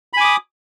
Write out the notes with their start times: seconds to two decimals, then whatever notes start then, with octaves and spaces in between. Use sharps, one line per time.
0.13 B5
0.17 G#5
0.21 D6
0.24 D#6